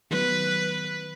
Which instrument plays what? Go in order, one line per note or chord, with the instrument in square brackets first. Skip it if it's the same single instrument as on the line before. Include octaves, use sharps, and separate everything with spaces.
[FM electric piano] D#3 F#3 B3 [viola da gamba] B4